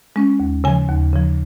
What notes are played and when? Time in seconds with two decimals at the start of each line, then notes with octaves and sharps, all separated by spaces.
0.16 G#3 C#4
0.40 D#2
0.64 C#3 F3 G#5
0.89 D#2
1.13 C#3 F3